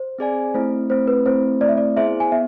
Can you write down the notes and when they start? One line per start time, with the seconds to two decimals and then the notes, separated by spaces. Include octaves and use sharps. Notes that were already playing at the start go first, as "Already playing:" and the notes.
Already playing: C5
0.19 C4 G#4 D5 G#5
0.54 A3 C4 E4 C5
0.90 A3 C4 E4 C5
1.08 B4
1.25 A3 C4 E4 C5
1.61 A3 C4 E4 D5
1.69 E5
1.78 D5
1.96 B3 E4 G#4 C5 E5
2.20 G#5
2.32 B3 E5